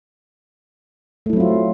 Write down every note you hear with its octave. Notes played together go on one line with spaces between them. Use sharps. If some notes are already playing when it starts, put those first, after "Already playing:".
F#3 A3 C4 E4 F4